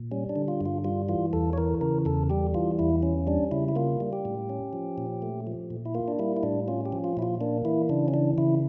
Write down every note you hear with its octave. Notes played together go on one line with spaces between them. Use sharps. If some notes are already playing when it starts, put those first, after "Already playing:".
Already playing: A#2
G3 C#4
D4
D3
F4
G2 F4
G3 F4
E3 F4
E2 A4
C#5
E3 A#4
C#3 A#4
E2 A4
G3 G4
E3 F4
E2 E4
C#4
G3 D4
C#3 E4
E4
A#3 F4
G3
G4
A2
C#4
F3
A#2
A3
F3
A#2
E4
A#3 F4
D4
G3 E4
E4
A2 D4
C#4 F4
G4
F3
F4
A#2 E4
F4
A#3 D4
E3 E4
C#3 D4
C#4
E3 D4
C#3 E4